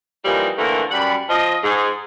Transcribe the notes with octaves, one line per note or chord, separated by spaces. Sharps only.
E3 F3 G3 A#3 D#4
D3 E3 A3 A#3 C4 A#4
F#2 G3 F#5 B5
F3 D#5
G#2 G#4